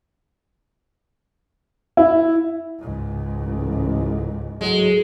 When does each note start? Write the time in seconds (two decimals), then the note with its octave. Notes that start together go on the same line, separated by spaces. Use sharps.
1.97 E4
2.79 C#2 G#2
3.45 A1
4.61 A2 F#3 G#3